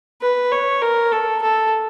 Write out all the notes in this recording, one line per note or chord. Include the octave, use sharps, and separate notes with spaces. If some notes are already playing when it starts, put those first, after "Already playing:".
B4
C#5
A#4
A4
A4